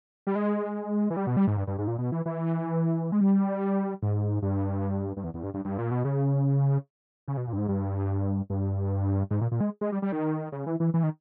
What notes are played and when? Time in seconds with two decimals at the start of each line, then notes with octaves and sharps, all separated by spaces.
0.27 G3
0.35 G#3
1.10 E3
1.17 G3
1.27 B2
1.37 G3
1.47 G#2
1.57 G2
1.67 G2
1.78 G#2
1.87 A#2
1.98 B2
2.12 E3
2.26 E3
3.12 G#3
3.21 G3
4.02 G#2
4.42 G2
5.17 G2
5.24 E2
5.34 E2
5.43 G2
5.54 G2
5.65 G2
5.78 A#2
5.91 B2
6.05 C#3
7.28 C#3
7.37 B2
7.47 A#2
7.53 G2
7.58 G#2
7.68 G2
8.50 G2
9.31 G#2
9.41 A#2
9.52 A#2
9.61 G#3
9.81 G#3
9.92 G3
10.02 G3
10.12 D#3
10.52 C#3
10.66 E3
10.80 E3
10.94 E3
11.03 D#3